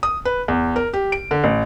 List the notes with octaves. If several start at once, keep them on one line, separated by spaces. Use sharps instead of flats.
D#6
B4
E2
A#4
G4
D7
D3
A1